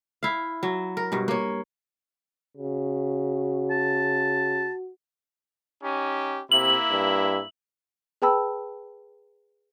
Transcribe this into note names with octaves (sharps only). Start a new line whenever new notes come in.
E4 F5
F#3
A#4
G2 B2
A#3 C#5
C#3 F#4
A5
C#4 D#4 G4
C3 A#3 E4 E5 F#7
G2
G#4 B4 G5 A5 B5 E6